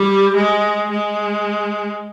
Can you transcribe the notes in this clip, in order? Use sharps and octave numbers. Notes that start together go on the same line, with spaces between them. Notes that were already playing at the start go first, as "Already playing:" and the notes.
Already playing: G3
G#3
G#3